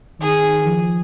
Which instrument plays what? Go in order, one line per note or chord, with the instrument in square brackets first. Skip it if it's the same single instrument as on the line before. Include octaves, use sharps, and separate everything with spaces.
[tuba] D#3 [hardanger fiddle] G#4
[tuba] F3